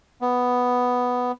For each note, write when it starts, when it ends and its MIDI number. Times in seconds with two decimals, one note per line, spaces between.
0.21 1.32 59